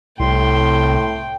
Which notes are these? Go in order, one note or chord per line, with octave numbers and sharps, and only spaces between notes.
C2 A2 G5 C6